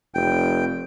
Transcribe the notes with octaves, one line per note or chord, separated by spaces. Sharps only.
F1 G5